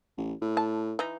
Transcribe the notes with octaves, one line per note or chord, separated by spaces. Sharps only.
A1
A2
A5
E3 D#4